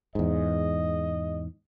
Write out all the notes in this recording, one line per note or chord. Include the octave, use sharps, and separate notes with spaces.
E2 G#2 D#5